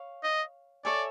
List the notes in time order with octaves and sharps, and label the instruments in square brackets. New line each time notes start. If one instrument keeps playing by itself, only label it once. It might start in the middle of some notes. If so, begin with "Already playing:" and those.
Already playing: [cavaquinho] C#5 F5
[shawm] D#5
[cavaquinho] A4 C#5 E5 G#5 [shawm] D5